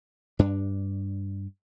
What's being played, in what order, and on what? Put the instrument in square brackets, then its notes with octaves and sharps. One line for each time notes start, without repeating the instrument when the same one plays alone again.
[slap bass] G2 D4